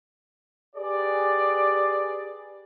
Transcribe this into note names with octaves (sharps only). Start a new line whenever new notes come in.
G4 G#4 B4 D5